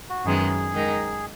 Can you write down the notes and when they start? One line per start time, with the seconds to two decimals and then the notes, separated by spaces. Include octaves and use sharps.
0.10 F#4
0.25 F#2 D#3 G#3 B3 G#4
0.72 D#3 G#3 D#4 A#4